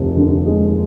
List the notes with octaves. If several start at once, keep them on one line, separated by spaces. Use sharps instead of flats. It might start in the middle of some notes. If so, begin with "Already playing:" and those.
Already playing: F1 D#2
D3
G#3